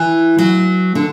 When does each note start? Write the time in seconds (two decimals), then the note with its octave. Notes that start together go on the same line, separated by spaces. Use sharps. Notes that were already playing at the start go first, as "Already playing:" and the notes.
Already playing: E3
0.38 F#3
0.95 D3